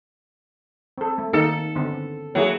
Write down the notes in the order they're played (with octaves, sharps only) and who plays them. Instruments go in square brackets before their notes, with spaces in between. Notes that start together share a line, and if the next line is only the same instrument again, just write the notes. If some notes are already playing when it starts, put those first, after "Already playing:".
[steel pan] C4 A4
A3
[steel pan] D#3 A#3 D#4 [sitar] A4
[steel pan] D3 B3 C4
[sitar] F#3 [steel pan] A#3 E4 G#4